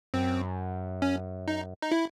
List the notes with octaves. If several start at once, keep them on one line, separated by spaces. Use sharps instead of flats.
F#2 C4
C#4
D#4
D#4
E4